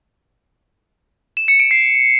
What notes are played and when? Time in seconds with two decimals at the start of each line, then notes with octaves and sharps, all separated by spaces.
1.37 E7
1.48 C#7
1.60 D7
1.71 C7